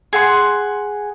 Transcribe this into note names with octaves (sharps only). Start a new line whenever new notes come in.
G#4 F#5 C6